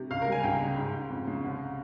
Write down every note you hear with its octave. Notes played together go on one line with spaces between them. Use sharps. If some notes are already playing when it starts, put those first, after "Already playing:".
Already playing: C3
C#2 F5
A#4
G3 G#5
C#2 G5
C#3
G#2
G#2
F2
C#3
C2